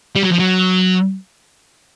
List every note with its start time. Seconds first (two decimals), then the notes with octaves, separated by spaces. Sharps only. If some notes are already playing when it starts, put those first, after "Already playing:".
0.15 G3
0.23 F#3
0.32 F3
0.39 F#3